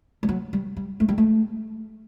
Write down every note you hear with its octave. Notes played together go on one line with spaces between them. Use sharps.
G3
F#3
G3
G3
A3
G3
A3